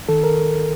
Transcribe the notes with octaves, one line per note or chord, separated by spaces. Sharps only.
D#3 A4
A#4